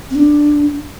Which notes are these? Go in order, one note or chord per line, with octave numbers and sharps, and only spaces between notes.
C4
D4